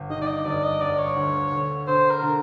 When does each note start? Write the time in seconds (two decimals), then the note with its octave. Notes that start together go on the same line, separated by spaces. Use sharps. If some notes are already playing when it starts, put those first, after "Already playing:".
Already playing: G1
0.10 D#3 D#5
0.22 D5
0.27 D#5
0.45 G1 D5
0.63 D#5
0.81 G1 D5
0.99 C#5
1.16 D2
1.52 D3
1.87 D3 C5
2.11 A#4
2.22 D3